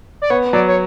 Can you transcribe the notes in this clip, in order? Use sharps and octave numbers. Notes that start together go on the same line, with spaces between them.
D5
B3 C#5
F#3 D5
C#5